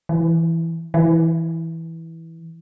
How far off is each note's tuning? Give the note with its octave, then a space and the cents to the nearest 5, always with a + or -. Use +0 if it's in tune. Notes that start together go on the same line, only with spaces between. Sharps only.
E3 +0
E3 -10